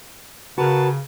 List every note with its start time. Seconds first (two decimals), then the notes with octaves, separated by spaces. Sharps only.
0.58 C#3 F#4 A#4 B4 A5